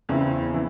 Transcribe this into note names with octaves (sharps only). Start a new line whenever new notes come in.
E2 C#3 E3 C4 E4
E3 E4